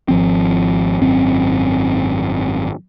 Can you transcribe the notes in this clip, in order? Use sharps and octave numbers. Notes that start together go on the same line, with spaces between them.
G#1 F3 C4
G#1 F#2 C4